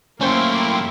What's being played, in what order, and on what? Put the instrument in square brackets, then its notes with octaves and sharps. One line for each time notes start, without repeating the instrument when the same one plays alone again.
[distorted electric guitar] F#2 A3 [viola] A#3 E4 [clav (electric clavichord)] C#4 C5 [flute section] G5 C6